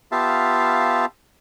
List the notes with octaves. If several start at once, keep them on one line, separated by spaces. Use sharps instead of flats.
B3 F4 G4 E5 F5 A5